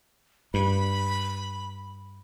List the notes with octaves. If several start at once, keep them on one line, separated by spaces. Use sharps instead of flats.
G2 B5